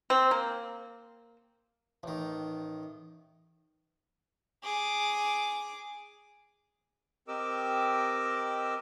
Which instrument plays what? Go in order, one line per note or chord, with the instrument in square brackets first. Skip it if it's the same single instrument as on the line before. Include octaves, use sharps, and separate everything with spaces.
[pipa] C4
A#3
[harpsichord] A1 D#3
[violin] G#4 D6
[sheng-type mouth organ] C4 G4 A#4 D#5 D6 E6